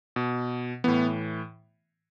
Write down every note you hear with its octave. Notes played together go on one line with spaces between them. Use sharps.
B2
A2 E3 B3